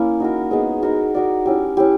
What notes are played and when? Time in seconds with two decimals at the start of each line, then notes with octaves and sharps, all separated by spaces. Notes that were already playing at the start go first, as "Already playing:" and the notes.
Already playing: A#3 C#4 E4
0.20 D#4 F#4 A#4
0.51 G#3 B3 D#4 G#4
0.83 D#4 F#4 A#4
1.14 D#4 F#4 A#4 D5
1.46 C#4 E4 G4
1.77 C#4 E4 G4